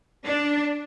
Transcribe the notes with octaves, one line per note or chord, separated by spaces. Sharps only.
D4